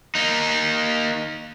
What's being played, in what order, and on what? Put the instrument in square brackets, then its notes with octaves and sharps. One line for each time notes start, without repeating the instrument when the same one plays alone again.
[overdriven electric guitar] A#3 D#4